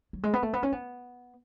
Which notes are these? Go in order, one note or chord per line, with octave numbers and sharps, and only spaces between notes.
F#3
G#3
B3
A3
B3
C#4
B3